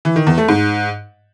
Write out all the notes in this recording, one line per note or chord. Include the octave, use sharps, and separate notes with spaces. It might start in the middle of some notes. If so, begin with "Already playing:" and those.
E3
D#3
E2
A3
G#2